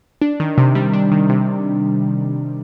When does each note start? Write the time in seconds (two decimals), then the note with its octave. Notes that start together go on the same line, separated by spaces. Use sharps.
0.22 D4
0.40 D#3
0.58 C3
0.75 G3
0.93 D4
1.12 D#3
1.29 C3